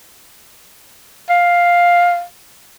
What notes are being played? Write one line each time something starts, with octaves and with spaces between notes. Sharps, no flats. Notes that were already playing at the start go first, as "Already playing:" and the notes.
F5